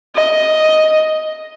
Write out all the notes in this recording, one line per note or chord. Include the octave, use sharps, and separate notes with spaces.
D#5